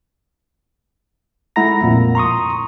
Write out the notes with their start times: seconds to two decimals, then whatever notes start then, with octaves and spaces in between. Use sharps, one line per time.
1.56 G#3 A3 E4 F#5 A#5 A#6
1.81 B1 F2 A#2
2.15 A#5 C6 C#6 D#6